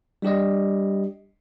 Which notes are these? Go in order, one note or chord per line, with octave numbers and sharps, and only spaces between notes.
G3 D4 G4 D5 D#5